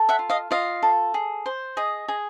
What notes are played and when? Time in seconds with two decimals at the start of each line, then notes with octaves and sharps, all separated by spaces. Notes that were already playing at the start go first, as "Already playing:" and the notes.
Already playing: A4
0.09 E5 F#5
0.19 F4
0.30 D#5 F5
0.51 F4 D#5 F5
0.83 A4
1.14 G#4
1.46 C5
1.77 G#4 D#5
2.08 G#4